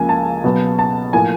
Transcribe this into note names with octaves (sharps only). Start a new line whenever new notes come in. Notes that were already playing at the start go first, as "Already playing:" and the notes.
Already playing: C#2 C#3 F3 A#3 G#5
A5
B2 F#3 B3
A5
A2 F3 A#3 G#5